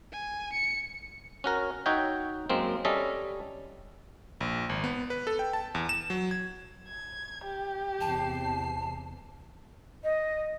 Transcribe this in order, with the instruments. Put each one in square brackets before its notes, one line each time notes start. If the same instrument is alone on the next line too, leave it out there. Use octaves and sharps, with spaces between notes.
[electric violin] G#5
C#7
[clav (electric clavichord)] C#4 F#4 A#4
D#4 F#4 C#5 E5 G5
F#2 G#3 A#3 C4
G3 C#4 A4 D#5 E5
[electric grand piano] A#1
G#1
B3
B4
A4
G5
A5
E2
E7
F#3
G#6
[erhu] G#6
G4
[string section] E2 C3 C7 [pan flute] A5
[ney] D#5